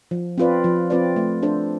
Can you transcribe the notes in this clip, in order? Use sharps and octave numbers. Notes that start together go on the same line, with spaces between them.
F3
C4 F4 B4 D5
F3
C4 F4 B4 D5
A3
D4 A4 C5